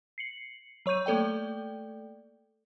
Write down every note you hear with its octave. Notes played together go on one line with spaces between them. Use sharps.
C7 C#7 F#7
F#3 C#5 C#6 G6 D#7
A3 A#3 A4 D5 G5